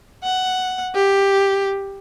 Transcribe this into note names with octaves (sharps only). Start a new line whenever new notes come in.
F#5
G4